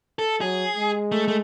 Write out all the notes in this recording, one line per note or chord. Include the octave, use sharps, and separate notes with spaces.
A4
F#3 G#4
G#3
A3
A3